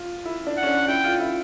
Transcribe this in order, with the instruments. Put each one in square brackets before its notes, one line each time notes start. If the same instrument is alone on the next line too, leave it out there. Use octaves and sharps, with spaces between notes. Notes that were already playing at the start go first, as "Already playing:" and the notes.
Already playing: [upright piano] F4
E4
D4
[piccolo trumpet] F#5
[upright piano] C#4
D4
[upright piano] E4 [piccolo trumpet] G5
[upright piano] F4
E4